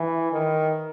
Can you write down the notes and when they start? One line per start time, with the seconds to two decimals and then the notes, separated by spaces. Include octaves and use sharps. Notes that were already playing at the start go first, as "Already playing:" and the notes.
Already playing: E3
0.32 D#3